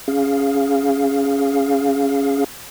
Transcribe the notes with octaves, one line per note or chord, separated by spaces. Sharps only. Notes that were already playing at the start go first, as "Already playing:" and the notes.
C#4 G#4 F5